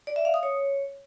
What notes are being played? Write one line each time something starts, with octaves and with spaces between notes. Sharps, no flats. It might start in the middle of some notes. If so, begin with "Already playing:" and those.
D5
E5
F5
D#6
C#5